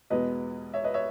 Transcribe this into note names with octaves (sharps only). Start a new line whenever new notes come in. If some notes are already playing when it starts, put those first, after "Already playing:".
E2 B2 G#3 B3 B4 D#5
C#5 E5
B4 D#5
C#5 E5